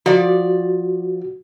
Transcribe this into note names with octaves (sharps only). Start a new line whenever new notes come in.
F3 F#4 D5